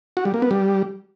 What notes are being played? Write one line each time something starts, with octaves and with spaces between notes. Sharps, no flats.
F#4
G3
A#3
B3
G3